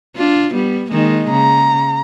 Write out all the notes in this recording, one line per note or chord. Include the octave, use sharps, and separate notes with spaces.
D4 F4
G3 B3
D#3 G#3 A#3
C#3 A#5